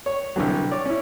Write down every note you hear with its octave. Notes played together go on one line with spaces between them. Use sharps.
C#5
C2 D3 E3 F#3
C#5 D5
C#4 E4